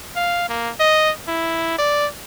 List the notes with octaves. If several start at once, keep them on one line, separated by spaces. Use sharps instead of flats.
F5
A#3
D#5
E4
D5